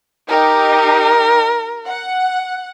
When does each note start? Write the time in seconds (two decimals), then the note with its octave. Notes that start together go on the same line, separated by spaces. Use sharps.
0.29 D#4 G4 A#4
1.86 F#5